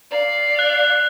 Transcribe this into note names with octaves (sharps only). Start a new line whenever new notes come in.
D5 F5
F#6